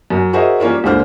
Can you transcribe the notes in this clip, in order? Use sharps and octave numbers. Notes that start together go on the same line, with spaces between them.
F#2
F#4 G#4 A#4 C5 D#5 E5
G3 A#3 C#4 F4 A#4
C#2 A#2 D3 C5 F6